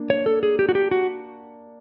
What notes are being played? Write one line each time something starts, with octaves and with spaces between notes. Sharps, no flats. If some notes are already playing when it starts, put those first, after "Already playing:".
Already playing: A#3 D4
C#5
A4
G#4
G4
F#4
G4
F#4